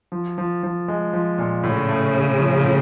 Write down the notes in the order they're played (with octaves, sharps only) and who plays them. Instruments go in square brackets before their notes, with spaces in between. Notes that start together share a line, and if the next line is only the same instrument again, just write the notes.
[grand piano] F3
F3
F3
G#3
F3
A#2
[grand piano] A2 [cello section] C#3
[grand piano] A3
C#4
F3
A2